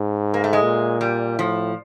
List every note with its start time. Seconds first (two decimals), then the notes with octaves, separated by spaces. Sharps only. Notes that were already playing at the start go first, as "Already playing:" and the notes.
Already playing: G#2
0.34 A#3
0.44 A3
0.53 G#3
0.62 A#2
1.01 G3
1.39 A2 F3